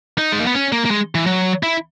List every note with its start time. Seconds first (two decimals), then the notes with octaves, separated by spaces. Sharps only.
0.18 D#4
0.32 G#3
0.40 A#3
0.47 B3
0.54 C#4
0.72 A#3
0.85 A#3
0.91 G#3
1.15 E3
1.26 F#3
1.63 E4